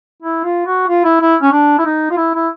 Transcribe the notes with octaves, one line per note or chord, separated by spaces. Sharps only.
E4
F4
F#4
F4
E4
E4
C#4
D4
E4
D#4
F4
E4
E4